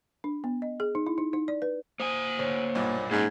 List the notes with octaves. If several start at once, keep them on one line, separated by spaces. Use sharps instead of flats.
D4
B3
D#5
G#4
D#4
E4
D#4
D#4
D5
B4
A#3 C5 F#5 G#5 D#6
D2 C5 C#5
B1 G2 A#2
G#2 A#3 C#4 G#6